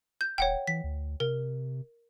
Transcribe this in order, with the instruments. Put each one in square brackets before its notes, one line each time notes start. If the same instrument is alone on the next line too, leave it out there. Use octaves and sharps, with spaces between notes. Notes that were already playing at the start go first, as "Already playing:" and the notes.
[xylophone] G6
[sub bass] D#1 [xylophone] C#5 F#5 G5
[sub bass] E3 [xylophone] B6
[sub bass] D2
[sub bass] C3 [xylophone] A#4